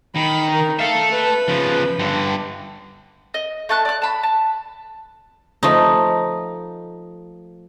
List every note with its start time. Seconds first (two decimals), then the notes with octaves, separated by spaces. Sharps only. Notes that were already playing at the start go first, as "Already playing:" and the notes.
0.15 D#3 B5
0.50 D#4 A#4
0.79 A4 E5 F5
1.10 B4
1.48 C#3 F3
1.99 G2 D3
3.34 D#5
3.69 A3 A5 F#6
3.85 D5 F#6
4.02 A5 B5
4.23 A5
5.63 F3 A3 D#4